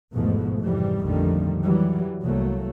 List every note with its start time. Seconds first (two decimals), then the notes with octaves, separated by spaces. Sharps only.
0.14 G#1 E2 G#2 B2 F3 A3
0.59 F2 G#2 C3 E3 G3
1.03 A#1 F2 D3 D#3 G3 A3
1.62 E3 F#3 G3
2.23 C2 F#3 A3 A#3